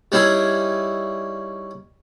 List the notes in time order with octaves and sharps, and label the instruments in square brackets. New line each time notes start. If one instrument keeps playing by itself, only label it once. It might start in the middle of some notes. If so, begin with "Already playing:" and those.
[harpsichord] G3 C#4 D#4 E4 G#4